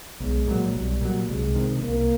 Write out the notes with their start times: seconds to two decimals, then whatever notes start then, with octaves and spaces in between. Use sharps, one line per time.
0.20 B1 G#3
0.48 A#2 F#3
0.74 B1 G3
1.01 A#2 F#3
1.28 C2 G#3
1.55 C3 D#3
1.82 C2 A#3